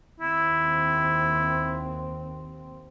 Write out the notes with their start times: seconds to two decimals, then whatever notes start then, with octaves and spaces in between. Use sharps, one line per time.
0.20 D#2 C4 E4